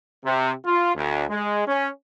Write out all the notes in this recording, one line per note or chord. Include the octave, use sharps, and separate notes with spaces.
C3
F4
D2
G#3
C#4